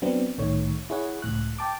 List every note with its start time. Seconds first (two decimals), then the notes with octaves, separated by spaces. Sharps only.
0.02 F#3 B3 C4 D4
0.38 C2 A2 D#3 A3 C#5
0.90 E4 G#4 C#5 F#5
1.22 C#2 A2 F#6
1.59 G5 A5 D6